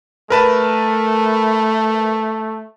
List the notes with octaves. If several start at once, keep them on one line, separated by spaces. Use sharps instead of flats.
A3 A#4 B4 A5